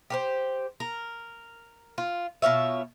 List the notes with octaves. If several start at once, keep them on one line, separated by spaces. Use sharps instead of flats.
G4 A#4 C5
A#4
F4
B2 F4 C#5 E5